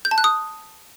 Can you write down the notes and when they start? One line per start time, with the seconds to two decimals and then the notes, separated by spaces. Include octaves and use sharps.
0.05 G6
0.11 A5
0.18 F#6
0.24 D#6